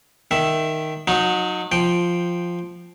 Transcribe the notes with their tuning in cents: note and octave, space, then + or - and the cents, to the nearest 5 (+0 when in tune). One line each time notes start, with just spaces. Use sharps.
D#3 +0 E5 +0
F#3 -25 D#4 +0
F3 +0 G5 +0